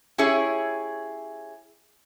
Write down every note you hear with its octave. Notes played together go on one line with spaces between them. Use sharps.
C#4 E4 G4 G#4 C#5